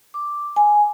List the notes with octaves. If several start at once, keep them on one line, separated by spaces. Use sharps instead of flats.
D6
G#5